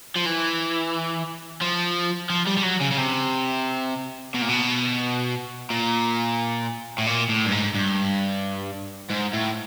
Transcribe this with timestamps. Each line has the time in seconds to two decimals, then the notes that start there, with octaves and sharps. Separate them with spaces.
0.16 F3
0.26 E3
1.62 F3
2.30 F3
2.47 G3
2.57 G3
2.63 F#3
2.81 C#3
2.92 C#3
2.98 C3
4.34 B2
4.42 A#2
4.49 B2
5.70 A#2
6.98 A2
7.06 A#2
7.29 A2
7.46 G2
7.52 G#2
7.75 G2
9.10 G#2
9.34 A2